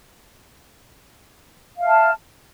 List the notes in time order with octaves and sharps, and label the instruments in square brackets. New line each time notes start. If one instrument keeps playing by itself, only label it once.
[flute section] F5
E5
F6
A5